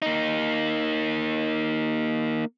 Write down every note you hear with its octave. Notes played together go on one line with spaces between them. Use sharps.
A#3 D#4